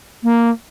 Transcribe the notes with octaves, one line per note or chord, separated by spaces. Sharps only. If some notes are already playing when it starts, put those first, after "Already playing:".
A#3